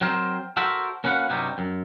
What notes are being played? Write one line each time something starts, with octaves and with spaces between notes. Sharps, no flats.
F#3 C4 A#4 C5
F#4 A4 A#4 C5 E5
A#3 C#4 F#4 B4 F5 F#5
G2 C3 F#3 G3 D#4
F#2